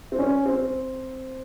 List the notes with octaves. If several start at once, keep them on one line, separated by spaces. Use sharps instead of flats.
C4
C#4
C4